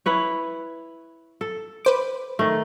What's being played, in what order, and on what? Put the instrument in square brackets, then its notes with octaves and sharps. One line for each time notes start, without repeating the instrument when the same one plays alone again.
[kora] E4 B4 C#5
A4
[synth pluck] B4 C5 D6
[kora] D#3 A3